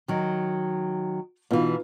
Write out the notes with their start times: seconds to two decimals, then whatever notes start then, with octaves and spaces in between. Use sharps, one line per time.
0.08 D#3 F#3
1.51 B2 E3 B3 D#4 F4